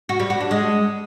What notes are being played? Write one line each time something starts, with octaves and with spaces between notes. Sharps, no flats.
F#4
G3
F#4
D4
G#3